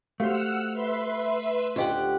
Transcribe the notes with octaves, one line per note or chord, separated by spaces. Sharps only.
A3 F#4 G4 C5 F5 F#5 E6 F6
B4 E5 C6
D2 F4 G4 D#5 F#5